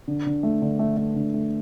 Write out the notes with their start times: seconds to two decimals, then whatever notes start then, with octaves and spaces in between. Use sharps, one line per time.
0.08 D3
0.26 D3
0.43 A3
0.62 D3
0.79 A3
0.97 A3
1.16 D3
1.34 A3